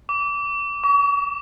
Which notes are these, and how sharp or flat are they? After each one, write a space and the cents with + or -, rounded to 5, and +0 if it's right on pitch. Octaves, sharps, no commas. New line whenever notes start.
D6 -25
C#6 +40